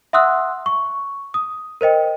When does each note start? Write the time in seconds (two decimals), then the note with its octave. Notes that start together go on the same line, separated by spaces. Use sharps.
0.13 E5 F#5 C6 D#6 E6 F#6
0.66 C#6
1.34 D#6
1.81 A#4 C5 D#5 G5